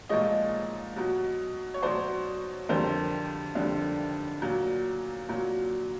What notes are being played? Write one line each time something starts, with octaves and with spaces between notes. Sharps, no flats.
A#2 F3 G#3 C#5 D#5
B2 F#3
C#5
B2 F#3 C5 D5
F2 D3 G3 A#4 C5
F2 D3 G3
A#2 F#3
A#2 F#3